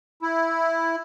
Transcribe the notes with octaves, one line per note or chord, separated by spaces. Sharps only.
E4